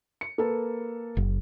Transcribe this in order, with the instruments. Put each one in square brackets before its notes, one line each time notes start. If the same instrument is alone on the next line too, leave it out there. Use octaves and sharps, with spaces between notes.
[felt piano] C#7
A#3 A4 B4
[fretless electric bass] F#1